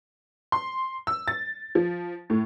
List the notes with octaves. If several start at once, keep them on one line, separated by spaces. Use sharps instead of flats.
C6
E6
A6
F3
A2